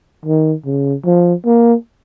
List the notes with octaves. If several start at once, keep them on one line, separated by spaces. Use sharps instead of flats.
D#3
C#3
F3
A#3